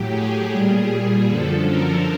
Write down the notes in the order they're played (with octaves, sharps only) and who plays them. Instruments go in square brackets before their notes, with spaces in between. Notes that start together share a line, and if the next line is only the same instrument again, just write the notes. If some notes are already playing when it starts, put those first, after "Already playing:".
Already playing: [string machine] A2 F#3 G4
G#4
A#2 G3 G#4
G#4
F#2 D3 F3 A4
A#4